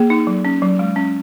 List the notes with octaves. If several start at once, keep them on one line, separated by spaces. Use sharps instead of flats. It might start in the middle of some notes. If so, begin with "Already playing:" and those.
Already playing: A#3 G#4
D#4
F#3
C#4
F#3
G#3
C#4